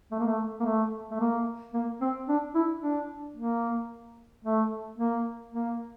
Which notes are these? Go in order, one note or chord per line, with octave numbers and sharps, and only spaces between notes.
A3
A#3
A3
A#3
A3
A3
A#3
A#3
C4
D4
E4
D4
A#3
A3
A#3
A#3